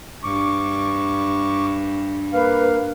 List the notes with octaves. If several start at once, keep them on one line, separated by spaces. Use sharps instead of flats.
G2 C#6 D6
A#3 B4 F5